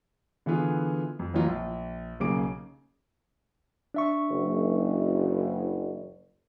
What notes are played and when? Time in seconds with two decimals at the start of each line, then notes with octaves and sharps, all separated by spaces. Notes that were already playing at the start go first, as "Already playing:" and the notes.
0.46 D3 E3 B3 F4 G#4
1.19 F2
1.34 D#3 E3 F#3 A#3 D#4 F4
1.46 A#1
2.20 B1 C#3 A#3 G#4 D6 D7
3.94 D4 E5 C#6
4.29 F#1